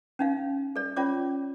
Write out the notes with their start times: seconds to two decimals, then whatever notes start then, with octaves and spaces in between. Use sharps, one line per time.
0.19 C#4 D#4 F5
0.76 A4 D5
0.96 C#4 F4 C#5 D5 D6